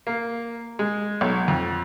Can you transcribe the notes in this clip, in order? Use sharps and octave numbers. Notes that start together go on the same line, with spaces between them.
A#3
G#3
B1
F2